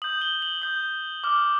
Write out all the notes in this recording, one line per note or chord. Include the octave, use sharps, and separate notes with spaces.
D#6 G6 F#7
G7
F#7
D#6 G6
D6 F6